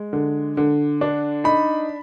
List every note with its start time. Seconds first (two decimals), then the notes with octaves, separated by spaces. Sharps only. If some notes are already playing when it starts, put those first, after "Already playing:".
Already playing: G#3
0.13 D3
0.57 D3
1.01 D4
1.44 D#4 B5